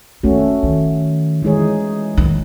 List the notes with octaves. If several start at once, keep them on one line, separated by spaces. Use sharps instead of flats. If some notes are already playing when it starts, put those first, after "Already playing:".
D#3 A3 C#4 F#4
D#3
E3 G#3 D#4 G#4 C#5
D#3